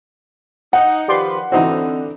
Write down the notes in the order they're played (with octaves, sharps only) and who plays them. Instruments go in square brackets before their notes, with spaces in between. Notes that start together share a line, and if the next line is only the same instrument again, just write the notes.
[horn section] D#4 [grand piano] F#5
[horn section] D#3 F3 B4 [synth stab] G4 D5 C6
[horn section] D3 [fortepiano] E3 D#4 F#4 [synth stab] C4